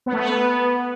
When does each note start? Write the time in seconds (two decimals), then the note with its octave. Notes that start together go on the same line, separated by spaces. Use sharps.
0.06 B3
0.13 A3
0.19 B3